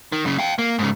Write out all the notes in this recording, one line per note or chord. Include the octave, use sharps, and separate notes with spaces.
D#3
F#2 C#3
F5 G5
A#3
G#2 C#3